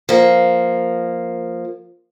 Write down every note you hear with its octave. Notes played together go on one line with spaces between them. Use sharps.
F3 A#3